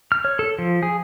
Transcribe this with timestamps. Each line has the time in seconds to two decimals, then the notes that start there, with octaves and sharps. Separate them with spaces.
0.12 F6
0.25 C#5
0.39 A4
0.59 F3
0.83 G#4